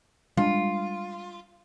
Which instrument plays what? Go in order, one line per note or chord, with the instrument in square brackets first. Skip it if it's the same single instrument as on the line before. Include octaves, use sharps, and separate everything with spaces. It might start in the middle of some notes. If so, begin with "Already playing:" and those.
[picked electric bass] G3 G#3 D4 [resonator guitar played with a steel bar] F4